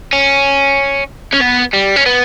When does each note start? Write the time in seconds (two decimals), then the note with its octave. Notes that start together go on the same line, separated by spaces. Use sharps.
0.13 C#4
1.34 C#4
1.41 B3
1.74 G3
1.96 C#4
2.06 B3